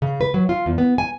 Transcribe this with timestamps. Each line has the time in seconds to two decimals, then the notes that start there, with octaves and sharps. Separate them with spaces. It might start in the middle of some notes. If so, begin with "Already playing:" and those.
0.02 C#3
0.21 B4
0.34 F#3
0.49 F4
0.66 E2
0.78 B3
0.98 G#5